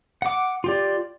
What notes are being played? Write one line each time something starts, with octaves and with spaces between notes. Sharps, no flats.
F#5 D6
F4 G4 D5